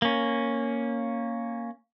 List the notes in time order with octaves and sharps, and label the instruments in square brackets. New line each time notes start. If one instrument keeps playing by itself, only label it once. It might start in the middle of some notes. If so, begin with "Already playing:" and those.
[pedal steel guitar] A#3 C#4